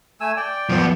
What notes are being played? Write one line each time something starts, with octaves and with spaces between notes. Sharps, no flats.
A3 G#5 E6
D5 G5
F3 B3